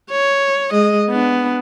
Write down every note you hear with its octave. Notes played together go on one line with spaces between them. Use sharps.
C#5
G#3 D#5
B3 D4